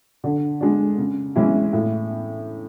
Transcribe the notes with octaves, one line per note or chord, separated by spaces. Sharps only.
D3
G#3 D4
C#3
E3 G#3 C#4 E4
A2